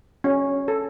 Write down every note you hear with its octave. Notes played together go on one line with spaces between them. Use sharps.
C#4
A4